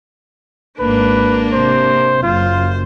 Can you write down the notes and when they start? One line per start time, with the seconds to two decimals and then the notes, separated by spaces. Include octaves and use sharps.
0.80 G#1 A#3 D4 B4
1.53 C3 C5
2.23 F#1 F#2 F4 C5